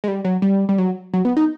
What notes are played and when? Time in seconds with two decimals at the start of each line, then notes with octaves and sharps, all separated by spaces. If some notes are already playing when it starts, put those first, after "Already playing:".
0.04 G#3
0.08 G3
0.25 F#3
0.42 G3
0.69 G3
0.78 F#3
1.14 F#3
1.25 B3
1.37 D#4